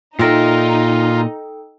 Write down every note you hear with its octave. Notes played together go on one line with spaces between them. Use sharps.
A#2 D#4 F4 A4 A#4 E5 G5 E6